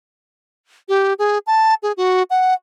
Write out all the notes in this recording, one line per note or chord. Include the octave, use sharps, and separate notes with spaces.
G4
G#4
A5
G#4
F#4
F#5